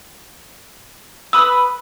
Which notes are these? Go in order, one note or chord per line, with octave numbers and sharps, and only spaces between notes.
B4 B5 D#6 E6